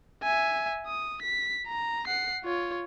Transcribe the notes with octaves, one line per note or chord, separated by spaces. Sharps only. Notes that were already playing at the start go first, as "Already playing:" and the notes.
E5 G#5
D#6
B6
A#5
F#5 C7
F4 C#5